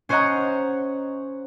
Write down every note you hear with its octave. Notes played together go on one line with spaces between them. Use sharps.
C#4 C5 C#5 D#5 F#5 A#5